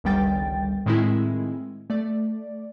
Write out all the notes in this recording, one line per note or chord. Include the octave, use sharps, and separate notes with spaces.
G1 C#2 D#3 G3 G5 A6
A2 D#3 G#3 C4 E4
A3 D5